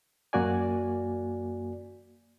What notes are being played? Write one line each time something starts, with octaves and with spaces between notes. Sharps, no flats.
F#2 A#3 F#4 D5 G#5